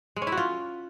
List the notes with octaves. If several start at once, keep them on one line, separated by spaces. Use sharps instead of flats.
G#3
C#4
E4
F#4
F4